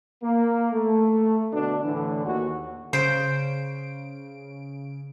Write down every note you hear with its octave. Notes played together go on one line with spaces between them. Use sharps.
A#3
A3
B2 D3 D4
A2 D3 E3
D#2 F#4
C#3 C5 D7